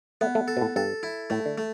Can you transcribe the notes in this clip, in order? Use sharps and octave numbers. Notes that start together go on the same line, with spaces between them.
A3 B3
A3
A4
B2
A2
G2 A4
E4
A2 A3
D3
A3